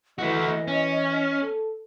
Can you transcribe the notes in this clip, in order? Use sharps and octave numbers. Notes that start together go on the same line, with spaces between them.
E3 A3 F#4 D#5
C#4
A4